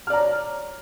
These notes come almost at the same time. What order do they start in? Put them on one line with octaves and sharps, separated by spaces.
F6 D5 A#5 C#5